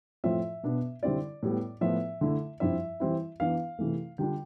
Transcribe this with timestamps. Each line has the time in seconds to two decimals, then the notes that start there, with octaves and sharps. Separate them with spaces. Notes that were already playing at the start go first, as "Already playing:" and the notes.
0.24 A2 F3 C4 F4 E5
0.63 B2 B3 D4
1.03 D3 G3 C4 E4 D5
1.43 A2 G3 B3
1.81 A2 F3 B3 E5
2.21 D3 A3 E4
2.60 G2 F3 C4 E4 E5
3.00 E3 G3 C4 E4
3.40 E3 B3 D4 F5
3.79 C3 E3 A3
4.18 D3 G3 D4 F4 G5